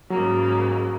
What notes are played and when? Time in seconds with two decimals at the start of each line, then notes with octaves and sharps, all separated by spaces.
0.10 G#2 C#3 F#3 A#3